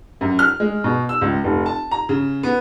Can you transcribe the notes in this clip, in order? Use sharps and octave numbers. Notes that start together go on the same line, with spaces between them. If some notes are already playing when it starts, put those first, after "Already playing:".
F#2
F6
G#3
B2
E6
C#2
F1
A5
A#5
C#3
B3